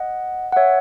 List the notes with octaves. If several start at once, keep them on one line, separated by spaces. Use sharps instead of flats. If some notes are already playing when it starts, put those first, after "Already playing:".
Already playing: D#5 F#5
F#5
C#5 E5